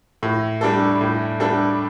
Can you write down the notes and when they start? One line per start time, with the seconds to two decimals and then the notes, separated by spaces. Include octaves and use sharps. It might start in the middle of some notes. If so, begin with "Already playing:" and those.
0.23 A2
0.61 G3 D4 A4
1.01 A2
1.40 G3 D4 A4